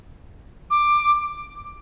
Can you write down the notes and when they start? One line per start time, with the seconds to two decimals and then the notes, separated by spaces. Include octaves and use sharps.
0.71 D6